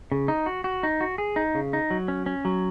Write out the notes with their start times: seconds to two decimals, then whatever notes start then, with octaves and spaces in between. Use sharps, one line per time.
0.12 C#3
0.28 D#4
0.46 F#4
0.64 F#4
0.83 D#4
1.01 F#4
1.18 G#4
1.36 D#4
1.55 C#3
1.73 D#4
1.90 F#3
2.08 C#4
2.26 C#4
2.45 F#3